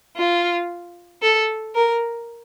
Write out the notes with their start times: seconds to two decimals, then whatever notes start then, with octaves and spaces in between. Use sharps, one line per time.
0.17 F4
1.22 A4
1.75 A#4